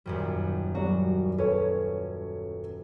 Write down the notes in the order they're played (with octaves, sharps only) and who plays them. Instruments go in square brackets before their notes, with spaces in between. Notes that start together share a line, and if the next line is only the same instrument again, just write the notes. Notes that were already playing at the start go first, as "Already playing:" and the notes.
[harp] D#1 F#2 G3
[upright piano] F#3 G3 [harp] F#4
[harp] C#4 [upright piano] A4 B4 C#5